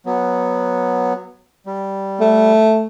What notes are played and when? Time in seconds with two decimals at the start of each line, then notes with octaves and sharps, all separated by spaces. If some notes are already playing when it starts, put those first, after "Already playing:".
0.06 F#3 B3
1.66 G3
2.20 A3